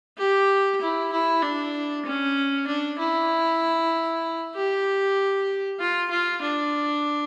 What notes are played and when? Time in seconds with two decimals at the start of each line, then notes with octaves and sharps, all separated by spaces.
0.18 G4
0.81 E4
1.12 E4
1.43 D4
2.06 C#4
2.67 D4
2.99 E4
4.55 G4
5.80 F4
6.10 F4
6.42 D4